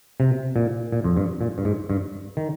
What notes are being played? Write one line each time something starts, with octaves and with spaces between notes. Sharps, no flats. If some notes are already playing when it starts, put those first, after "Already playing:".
C3
A#2
A#2
F2
G2
A#2
G2
G#2
G2
D#3